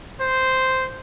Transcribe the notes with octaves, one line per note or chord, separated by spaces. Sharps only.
C5